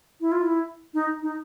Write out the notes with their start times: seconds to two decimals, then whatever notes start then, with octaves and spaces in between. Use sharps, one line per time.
0.21 E4
0.32 F4
0.43 E4
0.94 D#4
1.22 D#4